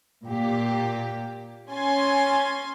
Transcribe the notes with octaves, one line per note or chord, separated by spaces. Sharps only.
A#2 G4
C#4 G#5 C6 A6